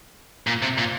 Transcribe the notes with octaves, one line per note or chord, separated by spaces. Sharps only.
A#2
C3
A#2